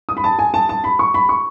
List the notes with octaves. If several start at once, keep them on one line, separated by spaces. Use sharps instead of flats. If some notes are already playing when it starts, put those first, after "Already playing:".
D#6
B5
A5
G#5
A5
A5
B5
C#6
B5
C#6